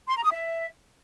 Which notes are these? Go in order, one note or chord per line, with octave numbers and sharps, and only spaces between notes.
C6
A#5
D#6
E5